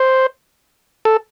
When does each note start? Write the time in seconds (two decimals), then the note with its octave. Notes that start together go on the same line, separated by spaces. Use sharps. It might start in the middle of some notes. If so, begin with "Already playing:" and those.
Already playing: C5
1.05 A4